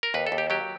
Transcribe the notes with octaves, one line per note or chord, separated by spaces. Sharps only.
A#4
D#2 B4
A4
D#2
G4
F#3 G4